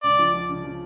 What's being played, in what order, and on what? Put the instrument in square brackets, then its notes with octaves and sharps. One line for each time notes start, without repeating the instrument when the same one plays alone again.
[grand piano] C#2 [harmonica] D5
[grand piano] F3
F3
C#3
F3